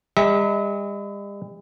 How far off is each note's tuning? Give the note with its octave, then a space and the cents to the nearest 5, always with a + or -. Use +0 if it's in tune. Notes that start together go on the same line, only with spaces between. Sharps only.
G3 +45 E5 -40 A#5 -10